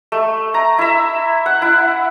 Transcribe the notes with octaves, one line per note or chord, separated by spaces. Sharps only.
A3
A#5
E4 E5
F#5
E4